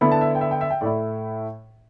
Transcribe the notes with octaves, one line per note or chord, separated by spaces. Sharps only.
D3 B3 E4 B5
A5
E5
G5
E5
G5
E5
G5
A2 A3 E4 D5